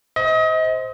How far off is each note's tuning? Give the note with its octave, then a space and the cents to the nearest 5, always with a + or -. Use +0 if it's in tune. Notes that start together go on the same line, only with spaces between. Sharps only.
C5 -5 D#5 +35